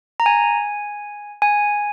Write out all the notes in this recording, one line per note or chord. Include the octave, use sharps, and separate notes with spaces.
A#5
G#5
G#5